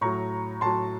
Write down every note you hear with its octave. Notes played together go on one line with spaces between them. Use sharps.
A2 F#3 A#5 C#6
A2 F#3 A5 C6